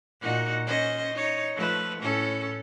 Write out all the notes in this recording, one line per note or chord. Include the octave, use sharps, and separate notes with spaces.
A#2 D#4 F#4
C#4 C5 D#5
D#4 C#5
F3 A3 B4
A2 C#4 A4